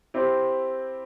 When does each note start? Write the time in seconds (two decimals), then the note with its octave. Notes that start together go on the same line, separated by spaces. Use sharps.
0.14 C4 E4 G4